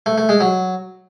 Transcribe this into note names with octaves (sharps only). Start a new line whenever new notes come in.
A3
A3
G#3
F#3